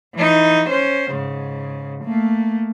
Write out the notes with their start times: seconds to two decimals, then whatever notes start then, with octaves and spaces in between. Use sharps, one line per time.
0.15 E3 D#4
0.70 C#4 C5
1.11 G#2 C#3
2.04 A3 A#3